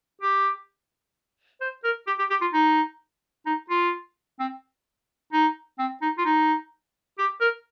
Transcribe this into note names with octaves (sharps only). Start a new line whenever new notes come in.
G4
C5
A#4
G4
G4
G4
F4
D#4
D#4
F4
C4
D#4
C4
D#4
F4
D#4
G4
A#4